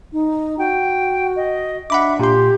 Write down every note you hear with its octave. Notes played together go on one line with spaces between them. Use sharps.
D#4
F#4 G5
D#5
D4 E5 F#5 B5 D6
A#2 G4 C6